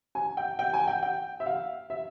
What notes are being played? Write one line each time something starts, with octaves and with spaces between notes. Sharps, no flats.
G#5
G5
G5
G#5
G5
G5
E5
F5
E5